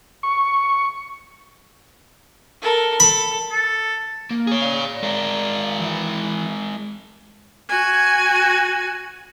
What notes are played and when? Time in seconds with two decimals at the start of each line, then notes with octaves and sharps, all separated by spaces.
0.23 C#6
2.62 A4 A#4
3.00 A4 B5
3.51 A4
4.31 A#3
4.47 G#4 C#5
4.62 D5 F5
5.03 G#3 A#4
5.79 E3 E4
7.69 F#4 G#5